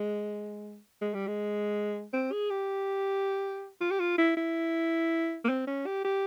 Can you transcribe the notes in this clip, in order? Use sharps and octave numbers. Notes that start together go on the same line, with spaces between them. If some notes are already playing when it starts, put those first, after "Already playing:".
Already playing: G#3
G#3
G3
G#3
C4
G#4
G4
F4
G4
F4
E4
E4
A#3
C4
C#4
G4
G4